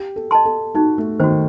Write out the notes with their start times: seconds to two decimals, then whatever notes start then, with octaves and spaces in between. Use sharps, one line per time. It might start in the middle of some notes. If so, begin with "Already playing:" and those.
Already playing: G4
0.16 A4
0.31 D#5 A5 C6
0.45 A4
0.75 D#4 F#4
0.98 A3
1.20 D#3 F#4 C5